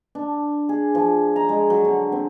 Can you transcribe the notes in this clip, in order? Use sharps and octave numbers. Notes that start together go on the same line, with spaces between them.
D4
G#4
F3
A#5
G#3
F#3
D3
C4